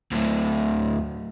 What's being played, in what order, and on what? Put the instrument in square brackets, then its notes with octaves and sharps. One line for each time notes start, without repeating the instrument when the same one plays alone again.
[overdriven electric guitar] D2 A2